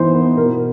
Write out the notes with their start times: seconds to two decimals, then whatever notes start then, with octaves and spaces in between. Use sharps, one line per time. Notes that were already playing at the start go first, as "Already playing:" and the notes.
Already playing: E3 B3 D#4 C5
0.15 B3
0.36 B2 A#4